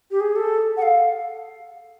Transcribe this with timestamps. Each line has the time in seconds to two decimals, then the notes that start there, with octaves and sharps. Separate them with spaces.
0.11 G4
0.20 G#4
0.36 A4
0.77 F#5
0.82 F5